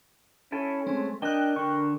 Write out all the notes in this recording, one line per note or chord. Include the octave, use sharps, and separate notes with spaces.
C#4 E4 A4 G#5
G#3 A3 C4
D4 A#4 D#5 G5 F#6
D3 C#6